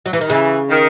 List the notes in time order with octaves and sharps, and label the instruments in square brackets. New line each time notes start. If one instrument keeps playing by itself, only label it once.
[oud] F#3
E3
D#3
[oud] C#3 [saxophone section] E3
[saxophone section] D#3